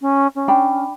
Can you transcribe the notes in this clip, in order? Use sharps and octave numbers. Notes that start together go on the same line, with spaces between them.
C#4
C#4
D4 G5 B5